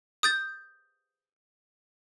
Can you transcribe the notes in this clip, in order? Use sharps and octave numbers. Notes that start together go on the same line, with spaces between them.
D#6 G6 A6